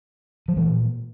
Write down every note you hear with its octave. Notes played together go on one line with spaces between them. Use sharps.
F3
A#2 E3